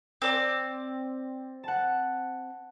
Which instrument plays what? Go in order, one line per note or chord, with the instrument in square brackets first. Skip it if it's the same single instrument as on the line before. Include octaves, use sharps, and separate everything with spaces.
[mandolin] C4 D5
[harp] F#5 A5